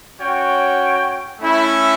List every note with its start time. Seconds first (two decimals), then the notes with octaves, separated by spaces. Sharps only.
0.19 C#4 F#4 C#5 G5
1.40 A3 C#4 E4